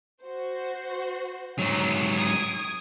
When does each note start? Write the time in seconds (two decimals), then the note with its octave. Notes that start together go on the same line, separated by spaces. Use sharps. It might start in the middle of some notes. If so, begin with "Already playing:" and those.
0.23 F#4 C5
1.59 G#2 F#3
2.15 D#6 G#6 D7